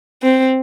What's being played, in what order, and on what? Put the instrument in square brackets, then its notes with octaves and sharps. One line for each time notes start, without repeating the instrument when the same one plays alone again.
[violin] C4